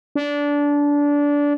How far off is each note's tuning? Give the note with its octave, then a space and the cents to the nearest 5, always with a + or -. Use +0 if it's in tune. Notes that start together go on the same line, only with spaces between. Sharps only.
D4 -20